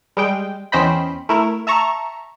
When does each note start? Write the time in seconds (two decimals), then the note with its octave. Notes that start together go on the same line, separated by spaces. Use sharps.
0.17 G3 G#3 G5
0.72 E2 C#4 C5 D#5 G5 B5
1.29 A3 E4 A#4
1.67 E5 A5 A#5 C#6